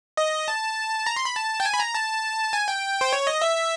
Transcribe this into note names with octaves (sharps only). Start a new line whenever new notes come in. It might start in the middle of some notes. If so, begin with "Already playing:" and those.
D#5
A5
A#5
C6
B5
A5
G5
G#5
B5
A#5
A5
G#5
G5
C5
C#5
D#5
E5